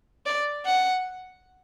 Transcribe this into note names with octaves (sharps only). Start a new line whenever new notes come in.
D5
F#5